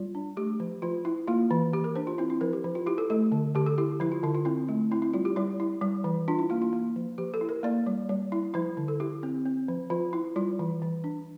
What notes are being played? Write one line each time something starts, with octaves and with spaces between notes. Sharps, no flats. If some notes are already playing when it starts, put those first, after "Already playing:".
Already playing: G3 F4
D4
A3 G4
F3
F3 F4
E4
A#3 F4
E3
E3 G4
A#4
D4 C5
F4
C4 E4
E4
F3 A#4
G4
F3
F4
E4 G4
A4
A3 A4
D3
D3 G4
A4
E4 G4
F3 E4
F4
D3 E4
F4
C4 E4
A3
C4 E4
E4
G3 F4
G4
G3 E4
E4
G3
E3
D4 F4
E4
A#3 F4
F4
A#3
F3
F3 G4
A4
E4
A#4
A#3 D5
G3
G3
E4
F3 E4
D3
A4
E4 G4
C4
C4
F3
F3 F4
E4
G3 F4
E3
E3
D4